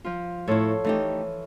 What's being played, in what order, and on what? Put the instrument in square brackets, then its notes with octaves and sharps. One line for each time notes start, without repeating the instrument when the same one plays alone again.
[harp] F3 F4
[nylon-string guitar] A2 E4 [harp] F4 A4 C#5
[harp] E3 [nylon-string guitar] A3 D#4 G4